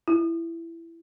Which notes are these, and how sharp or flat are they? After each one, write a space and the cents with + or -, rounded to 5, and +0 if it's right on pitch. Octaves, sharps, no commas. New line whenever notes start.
E4 +15